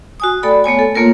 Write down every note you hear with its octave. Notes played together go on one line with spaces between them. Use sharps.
F#4 G#5 D#6
A3 F#4 A4 D5 G5 B5
A3 B3 C#5 G#5
A4
A3 A#3 F4 A#4 C#5